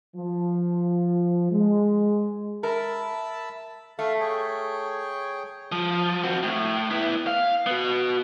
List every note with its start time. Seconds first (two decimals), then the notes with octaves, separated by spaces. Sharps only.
0.16 F3
1.52 G#3
2.63 A#4 E5 A5 B5
3.99 A3 A4 F5
4.20 G#4 C#5 G5
5.72 F3
6.24 C4 F#4
6.43 A2
6.91 B3 E4
7.27 F5
7.66 B3 F#4